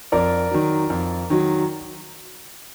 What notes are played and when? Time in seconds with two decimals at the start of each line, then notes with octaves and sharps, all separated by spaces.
0.12 F2 A#4 D5
0.51 D#3 F#3
0.90 F2
1.30 D#3 F#3